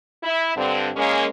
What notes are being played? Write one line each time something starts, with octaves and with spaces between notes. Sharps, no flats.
E4
G2 D3 C4
G#3 A#3 C#4